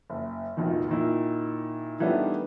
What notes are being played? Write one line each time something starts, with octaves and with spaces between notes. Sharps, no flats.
F#1
F1 A#1 D#2 B2 D#3
A#2 D#3 E4
D#3 E3 G3 A3 B3 D4